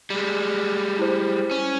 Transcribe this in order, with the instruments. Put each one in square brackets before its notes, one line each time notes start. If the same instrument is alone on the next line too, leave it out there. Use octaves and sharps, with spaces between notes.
[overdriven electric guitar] G3 G#3
[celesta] E4 C5
[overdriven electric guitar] C#4